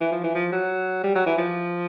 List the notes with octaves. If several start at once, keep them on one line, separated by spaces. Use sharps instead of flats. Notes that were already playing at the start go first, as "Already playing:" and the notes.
E3
F3
E3
F3
F#3
G3
F#3
E3
F3